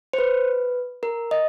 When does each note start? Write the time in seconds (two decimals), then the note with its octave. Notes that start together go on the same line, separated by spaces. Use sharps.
0.13 C5
0.18 B4
1.03 A#4
1.31 D#5